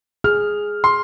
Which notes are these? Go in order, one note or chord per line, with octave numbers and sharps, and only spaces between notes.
G#4 F6
C6